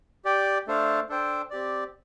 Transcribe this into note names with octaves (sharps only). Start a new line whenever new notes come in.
G4 D5 G5
A3 D4 A4 C5 F5
D4 A4 C5 G5
C4 G4 D5